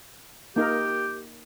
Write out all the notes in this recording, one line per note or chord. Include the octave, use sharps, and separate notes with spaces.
A#3 D#4 G4 A#4